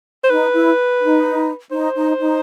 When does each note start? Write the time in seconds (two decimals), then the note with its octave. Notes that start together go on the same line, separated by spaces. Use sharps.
0.24 C5
0.30 D#4 B4
0.54 E4
1.01 D#4
1.71 D#4 C5
1.95 D#4
2.19 D#4